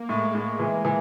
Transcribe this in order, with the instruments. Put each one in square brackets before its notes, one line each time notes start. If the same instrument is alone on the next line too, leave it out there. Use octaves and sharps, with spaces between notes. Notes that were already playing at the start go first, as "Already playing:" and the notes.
Already playing: [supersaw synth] A#3
[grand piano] A2 [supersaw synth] G#3
[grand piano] A2
E3
E3